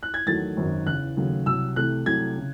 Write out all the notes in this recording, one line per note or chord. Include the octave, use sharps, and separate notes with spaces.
F#6
G#6
E2 D#3 F#3 A3 A6
G#1 F#2 D#3
E2 C#3 E3 F#6
D#2 C#3 F#3 A3
C2 C3 F#3 E6
C2 C3 E3 A3 F#6
C2 C3 F#3 A3 G#6
C#3